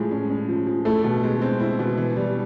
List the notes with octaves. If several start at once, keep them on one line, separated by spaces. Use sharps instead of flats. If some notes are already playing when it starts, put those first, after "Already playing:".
Already playing: A2 F3 G#3
C#4
C#4
F3
F3
A3 E4
B2
G#3
C4
E4
B2
E3
G3